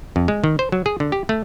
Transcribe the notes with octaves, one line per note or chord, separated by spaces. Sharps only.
F2
G#3
D#3
C5
F#3
G#4
D3
G4
A3